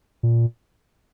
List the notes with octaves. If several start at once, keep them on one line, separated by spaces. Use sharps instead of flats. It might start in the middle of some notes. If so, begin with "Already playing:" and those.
A#2